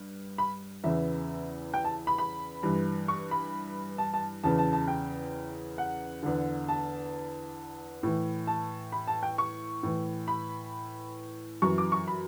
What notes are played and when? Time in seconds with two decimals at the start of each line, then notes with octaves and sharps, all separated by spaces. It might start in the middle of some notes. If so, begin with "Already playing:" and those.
Already playing: G2
0.38 B5
0.84 E2 C#3 E3 E5
1.74 G5
1.85 A5
2.07 B5
2.18 B5
2.63 G2 E3
3.08 C#6
3.31 B5
3.98 A5
4.14 A5
4.44 E2 C#3 E3 A5
4.58 A5
4.73 A5
4.88 G5
5.78 F#5
6.23 E2 D3
6.69 A5
8.03 A2 E3
8.47 A5
8.92 B5
9.08 A5
9.23 G5
9.38 C#6
9.83 A2 E3
10.28 B5
11.62 F#2 E3 C#6
11.78 D6
11.92 C#6
12.08 B5